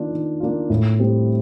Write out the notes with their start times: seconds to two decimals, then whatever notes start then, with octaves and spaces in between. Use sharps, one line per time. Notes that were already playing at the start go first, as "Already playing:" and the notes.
Already playing: D#3 A#3 D4 F4
0.11 D#3
0.40 A#3 D4 F4
0.70 A2
0.99 G3 C4